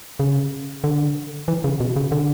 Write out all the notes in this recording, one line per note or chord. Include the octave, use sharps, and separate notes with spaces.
C#3
D3
E3
C#3
B2
C#3
D3